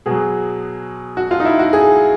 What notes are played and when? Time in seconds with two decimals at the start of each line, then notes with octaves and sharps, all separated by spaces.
0.06 B2 F#3 G#4
1.17 F#4
1.31 F4
1.40 D#4
1.45 E4
1.59 F#4
1.73 G#4